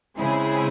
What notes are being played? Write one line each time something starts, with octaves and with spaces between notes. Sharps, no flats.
C#3 G#3 C4 E4 G#4